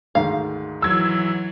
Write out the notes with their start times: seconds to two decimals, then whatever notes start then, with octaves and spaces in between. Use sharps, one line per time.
0.15 D2 G#2 D#3 F5
0.82 E3 F#3 E6 G#6